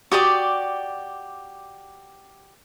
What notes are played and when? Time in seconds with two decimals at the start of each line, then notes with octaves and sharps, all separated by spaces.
0.12 F#4 G4 D5 D#6